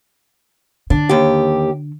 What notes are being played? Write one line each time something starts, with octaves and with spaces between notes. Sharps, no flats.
D3 D4
D#2 G4